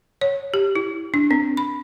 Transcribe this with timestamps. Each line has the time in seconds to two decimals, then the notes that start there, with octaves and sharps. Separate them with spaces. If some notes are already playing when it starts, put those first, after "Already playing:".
0.21 C#5
0.54 G4
0.75 E4
1.14 D4
1.31 C4
1.57 B5